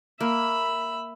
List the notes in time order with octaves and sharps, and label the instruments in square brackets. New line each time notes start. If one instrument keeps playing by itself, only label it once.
[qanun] A#3 [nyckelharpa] E5 B5